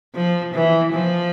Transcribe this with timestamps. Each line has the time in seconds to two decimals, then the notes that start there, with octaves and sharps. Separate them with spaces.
0.15 F3
0.54 E3
0.93 F3